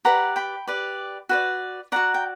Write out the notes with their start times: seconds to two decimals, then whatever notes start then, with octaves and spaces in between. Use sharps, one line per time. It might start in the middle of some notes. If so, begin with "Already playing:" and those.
0.05 G4 B4 D5 F#5 A#5
0.36 G5 B5
0.67 G4 B4 D5
1.29 F#4 B4 D5
1.92 F#4 B4 D5 F#5 A#5
2.14 G5